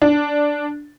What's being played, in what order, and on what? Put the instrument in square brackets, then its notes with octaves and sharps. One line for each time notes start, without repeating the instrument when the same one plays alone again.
[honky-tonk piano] D4